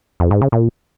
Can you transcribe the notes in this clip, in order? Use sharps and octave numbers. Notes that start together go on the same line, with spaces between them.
F2
G#2
C#3
A#2